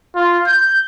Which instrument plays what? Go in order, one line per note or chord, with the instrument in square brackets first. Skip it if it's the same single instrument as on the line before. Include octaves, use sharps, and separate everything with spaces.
[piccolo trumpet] F4
G6